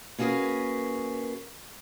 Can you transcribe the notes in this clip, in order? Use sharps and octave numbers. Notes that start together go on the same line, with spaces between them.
A#3 C#4 F#4 G#4 A#4 B4